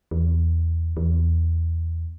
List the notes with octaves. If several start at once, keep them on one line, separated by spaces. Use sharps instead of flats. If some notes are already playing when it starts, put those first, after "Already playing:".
E2
E2